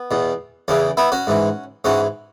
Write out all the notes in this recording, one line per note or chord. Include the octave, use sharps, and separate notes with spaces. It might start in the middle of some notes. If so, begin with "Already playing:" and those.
Already playing: B3
E2 B2
E2 C#3 E3 C#4
B3 E4
C#4 F#4
G#2 E3
G#2 E3 C#4 F#4